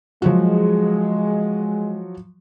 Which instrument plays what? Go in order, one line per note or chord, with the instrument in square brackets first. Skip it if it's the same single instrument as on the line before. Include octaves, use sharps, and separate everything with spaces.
[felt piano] F3 F#3 F#4 [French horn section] G#3